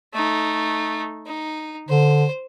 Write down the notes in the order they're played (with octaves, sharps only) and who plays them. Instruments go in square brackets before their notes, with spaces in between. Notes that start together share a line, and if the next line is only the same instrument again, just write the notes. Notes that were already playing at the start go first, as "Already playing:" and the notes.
[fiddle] A3 D#4
D#4
[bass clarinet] D3 [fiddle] C5